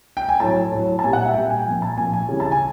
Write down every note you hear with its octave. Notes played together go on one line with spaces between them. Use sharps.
G5
G#5
A2 F#3 A5
A2 F#3
A5
A#2 G3 G#5
F#5
E5
A#2 G3 G5
G#5
G5
A#2 F3 G#5
A5
A#2 F3 G#5
G#5
C#3 E3 G3
A5
G#5